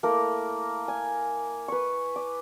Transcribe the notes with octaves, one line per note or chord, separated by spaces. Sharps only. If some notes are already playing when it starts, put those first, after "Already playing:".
A3 A#3 E4 A#4
G#5
B4 C#6
D6